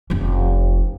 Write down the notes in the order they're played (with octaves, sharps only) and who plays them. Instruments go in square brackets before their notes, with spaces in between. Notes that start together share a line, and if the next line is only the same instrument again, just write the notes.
[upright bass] F1 C#4